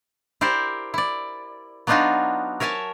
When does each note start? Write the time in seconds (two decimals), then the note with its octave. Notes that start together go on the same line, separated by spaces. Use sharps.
0.41 E4 G4 A#4 C5 D5
0.94 E4 D5
1.87 F#3 B3 D4 D#4 F4 F#4
2.60 A#4 C#5 E5 G#5 A5